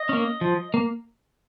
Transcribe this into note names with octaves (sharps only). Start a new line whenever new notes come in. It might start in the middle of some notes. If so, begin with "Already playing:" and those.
Already playing: D#5
A#3 C#4
F3
A#3